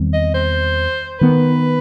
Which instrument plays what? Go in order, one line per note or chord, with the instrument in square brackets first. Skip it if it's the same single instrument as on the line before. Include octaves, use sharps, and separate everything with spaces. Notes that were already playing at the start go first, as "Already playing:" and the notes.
Already playing: [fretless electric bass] E2 D#3 G3 C4
[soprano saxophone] D#5
C5
[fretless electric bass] D#3 G3 B3 [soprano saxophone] B4